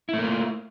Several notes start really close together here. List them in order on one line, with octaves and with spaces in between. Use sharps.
E4 A3 A#3 F4